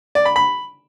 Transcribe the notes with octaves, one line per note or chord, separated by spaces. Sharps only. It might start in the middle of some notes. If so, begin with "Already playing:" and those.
D5
B5
B5